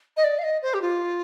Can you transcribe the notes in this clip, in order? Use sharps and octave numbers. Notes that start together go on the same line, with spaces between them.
D#5
D5
F5
D#5
C5
G4
F4